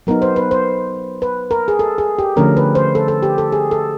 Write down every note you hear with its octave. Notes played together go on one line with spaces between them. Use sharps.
F#3 B3 D#4 A#4
C5
B4
C5
B4
A#4
G#4
A4
G#4
G4
D3 F3 A3 C#4 A#4
B4
C5
A4
A4
G4
A4
G#4
A4